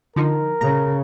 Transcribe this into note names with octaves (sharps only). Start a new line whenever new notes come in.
D3 F3 D#4 A#4
C#3 A#5